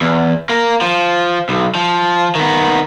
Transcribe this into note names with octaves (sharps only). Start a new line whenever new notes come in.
E2
A#3 A#4
F3
B1
F3
D#3 B3